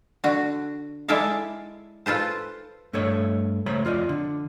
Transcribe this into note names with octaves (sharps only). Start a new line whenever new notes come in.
D3 F#4
G#3 E4 A4 D5 E5 F5
F4 A4 B4 C5
G2 A3 A4 C#5 D#5
C#2 A3 C5 C#5 A#5 B5
F2 F4 D5 D#5
D3